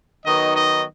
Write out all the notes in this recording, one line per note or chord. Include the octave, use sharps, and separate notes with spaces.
D#3 F#3 B3 D#4 D#5
D#5